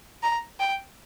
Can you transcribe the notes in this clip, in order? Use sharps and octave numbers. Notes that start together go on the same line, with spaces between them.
A#5
G5